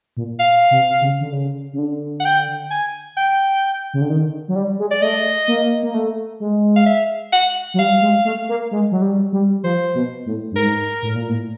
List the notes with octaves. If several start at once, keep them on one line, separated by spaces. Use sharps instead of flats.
A#2
F5
C3
C#3
D3
C#3
C#3
D3
F#5
G5
G#5
G5
C#3
D3
D#3
F#3
G3
G#3
D5
A3 D#5
A#3
A#3
A3
G#3
F5
E5
F#5
F#3
G3 F5
G#3
A3
A#3
G#3
F#3
G3
G3
F3 C5
B2
A2
G2
G#2 A#4
A2
A#2
A2